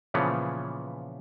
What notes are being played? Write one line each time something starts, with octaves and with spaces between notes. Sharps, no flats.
A#2 C#3 E3 F3 B3